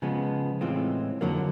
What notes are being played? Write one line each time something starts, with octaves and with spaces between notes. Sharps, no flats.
C#3 F3 G#3 B3
A2 E3 G#3 C4 F4
F2 D3 F#3 A#3